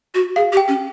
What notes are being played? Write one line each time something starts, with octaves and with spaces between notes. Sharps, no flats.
F#4
G#4 F5
G4
G5
C#4